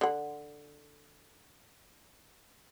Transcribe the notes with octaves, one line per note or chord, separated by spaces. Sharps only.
D3 F#5